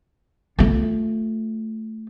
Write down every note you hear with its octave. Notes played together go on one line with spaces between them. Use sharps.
A3 F4